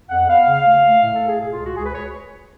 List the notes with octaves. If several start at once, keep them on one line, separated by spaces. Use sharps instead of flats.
F2 F#5
B3 F5
C#3
A3
A3
A2
A4
A2
G#4
B2 G#4
F4
C#2
F#4
C#2 G#4
B4
C#5